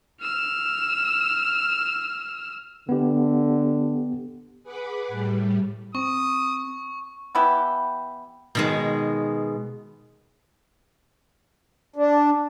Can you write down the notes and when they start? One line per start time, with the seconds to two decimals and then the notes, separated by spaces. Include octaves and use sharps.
0.21 E6 F6
2.89 D3 B3 G4
4.63 G#4 B4 F#5 B5 D6
5.08 A2 G3
5.95 C4 C#6 D#6
7.35 E3 B3 E4 G4
8.55 B2 D#3 G#3
11.96 D4